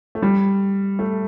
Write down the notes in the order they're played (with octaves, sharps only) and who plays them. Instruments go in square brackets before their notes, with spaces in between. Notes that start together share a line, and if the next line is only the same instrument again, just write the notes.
[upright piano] A3
G3
A3